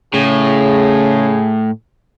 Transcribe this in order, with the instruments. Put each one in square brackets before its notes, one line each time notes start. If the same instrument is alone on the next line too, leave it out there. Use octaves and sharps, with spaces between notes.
[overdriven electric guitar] A2 [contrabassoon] C#3 [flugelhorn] G#4